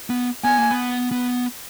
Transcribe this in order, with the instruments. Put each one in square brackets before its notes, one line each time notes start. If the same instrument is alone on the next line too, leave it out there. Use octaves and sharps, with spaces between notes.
[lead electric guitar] B3
[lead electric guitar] B3 [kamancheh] G#5
[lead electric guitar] A#3
B3
B3